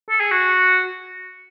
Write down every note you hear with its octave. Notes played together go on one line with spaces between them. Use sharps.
A4
G#4
F#4